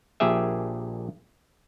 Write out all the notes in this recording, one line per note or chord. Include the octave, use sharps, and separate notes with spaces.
A#1 A#2 G4 G#4 E5